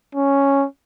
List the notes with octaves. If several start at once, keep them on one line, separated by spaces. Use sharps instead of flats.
C#4